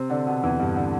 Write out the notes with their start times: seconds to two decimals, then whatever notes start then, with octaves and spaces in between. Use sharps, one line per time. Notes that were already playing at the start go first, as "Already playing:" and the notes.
Already playing: C3 C4
0.10 D3 D4
0.26 B2 B3
0.43 E2 E3
0.60 G2
0.76 D3